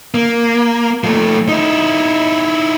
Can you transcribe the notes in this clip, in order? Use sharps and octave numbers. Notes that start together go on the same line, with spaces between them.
A#3
F3 A3
D#4 E4